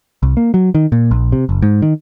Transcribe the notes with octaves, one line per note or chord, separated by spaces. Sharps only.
C2
A#3
F#3
D#3
A#2
A#1
C3
F#1
G#2
D#3